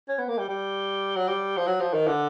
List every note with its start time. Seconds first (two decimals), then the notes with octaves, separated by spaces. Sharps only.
0.09 C#4
0.19 B3
0.29 A#3
0.38 G3
0.49 G3
1.16 F#3
1.28 G3
1.57 F3
1.67 F#3
1.81 F3
1.94 D#3
2.07 D3